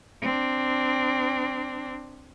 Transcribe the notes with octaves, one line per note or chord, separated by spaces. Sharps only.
C4 D4